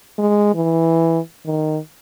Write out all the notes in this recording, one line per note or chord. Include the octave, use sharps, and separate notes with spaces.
G#3
E3
D#3